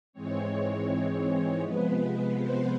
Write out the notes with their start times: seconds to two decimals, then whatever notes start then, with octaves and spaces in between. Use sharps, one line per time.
0.13 G#2 E3 G#3 C4 C#5
1.60 C3 F3 G#3 B3 B4
2.34 C5